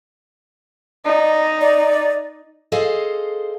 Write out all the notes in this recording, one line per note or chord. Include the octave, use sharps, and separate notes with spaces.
D#4 D5
D5
G#4 A4 C5 D#5 F5